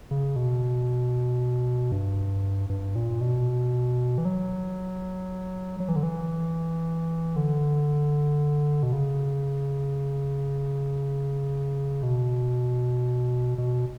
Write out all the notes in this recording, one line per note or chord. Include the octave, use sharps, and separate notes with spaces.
C#3
B2
G2
G2
A#2
B2
E3
F#3
F#3
E3
D3
E3
D3
B2
C#3
B2
B2